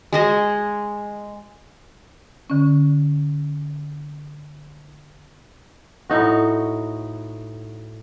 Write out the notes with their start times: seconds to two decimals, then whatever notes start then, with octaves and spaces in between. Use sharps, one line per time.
0.13 G#3 G#4 D#5
2.50 D3 C#4
6.10 A2 D#4 F#4